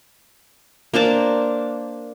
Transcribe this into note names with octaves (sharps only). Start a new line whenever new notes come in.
A#3 D4 C5 A5